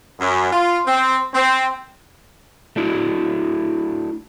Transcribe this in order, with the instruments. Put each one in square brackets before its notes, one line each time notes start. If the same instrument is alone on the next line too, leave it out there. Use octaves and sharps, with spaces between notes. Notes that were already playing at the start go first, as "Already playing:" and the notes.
[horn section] F#2
F4
C4
C4
[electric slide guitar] A3 D4 E4 F#4